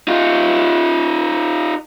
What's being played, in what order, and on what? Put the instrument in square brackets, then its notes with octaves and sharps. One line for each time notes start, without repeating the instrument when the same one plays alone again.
[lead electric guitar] D#4 F4